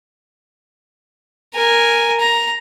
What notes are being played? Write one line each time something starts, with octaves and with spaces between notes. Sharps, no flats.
A#4 G#5
A#5